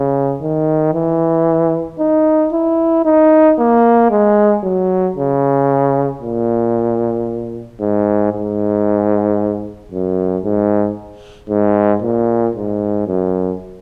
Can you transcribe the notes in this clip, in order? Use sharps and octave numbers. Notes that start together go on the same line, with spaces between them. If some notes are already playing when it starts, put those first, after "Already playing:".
Already playing: C#3
D#3
E3
D#4
E4
D#4
A#3
G#3
F#3
C#3
A#2
G#2
G#2
F#2
G#2
G#2
A#2
G#2
F#2